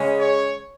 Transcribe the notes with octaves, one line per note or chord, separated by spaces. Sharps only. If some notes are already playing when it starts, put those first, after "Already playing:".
Already playing: C#3 G#3 C#4
C#5